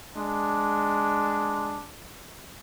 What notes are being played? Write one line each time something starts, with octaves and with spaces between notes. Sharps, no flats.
G#3 D4